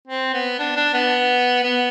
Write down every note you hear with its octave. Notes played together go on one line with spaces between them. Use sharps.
C4
B3
D4
D4
B3
B3